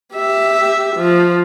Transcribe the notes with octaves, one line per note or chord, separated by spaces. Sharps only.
G4 E5
F3